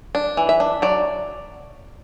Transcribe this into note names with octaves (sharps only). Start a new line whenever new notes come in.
D4
E3
E5
D4
F#3 D5